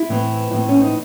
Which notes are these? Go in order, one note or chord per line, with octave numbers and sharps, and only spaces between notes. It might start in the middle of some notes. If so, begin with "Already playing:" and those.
Already playing: E4
A2 E3 C4
A2 E3 C4
C#4
D#4